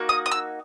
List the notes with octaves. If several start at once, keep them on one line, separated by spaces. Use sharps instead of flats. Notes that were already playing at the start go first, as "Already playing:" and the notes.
Already playing: A#3 D#4 F#4
D#6
D#6
E6